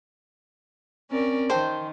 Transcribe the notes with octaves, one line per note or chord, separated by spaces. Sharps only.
C4 C#4 A#4 D5
D#3 C5 G5 A5